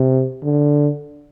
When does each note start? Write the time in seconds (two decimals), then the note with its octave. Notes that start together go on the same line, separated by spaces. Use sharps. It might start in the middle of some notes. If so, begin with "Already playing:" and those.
Already playing: C3
0.44 D3